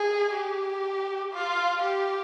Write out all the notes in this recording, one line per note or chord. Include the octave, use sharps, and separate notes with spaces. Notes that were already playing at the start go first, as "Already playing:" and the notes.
Already playing: G#4
G4
F4
G4